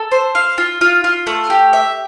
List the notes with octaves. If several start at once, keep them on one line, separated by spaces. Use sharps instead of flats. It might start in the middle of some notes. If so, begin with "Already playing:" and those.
Already playing: A4
C5
F5
F4
F4
F4
A3
G4
E5